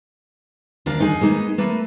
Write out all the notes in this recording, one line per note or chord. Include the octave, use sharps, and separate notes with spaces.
D2 D4 A#4 F5
D#4 G#4
G#3 A#3 B3 D#4
A3 A#3 B4